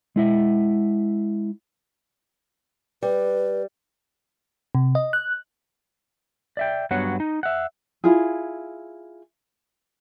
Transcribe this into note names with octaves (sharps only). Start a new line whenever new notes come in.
G#3 E4 E5
G3 B4
C3
D#5
F#6
D5 E5 G5
G2 F#3 B3 F#4 C#5 F#5
D#4
E5 F#5
E4 F4 G#4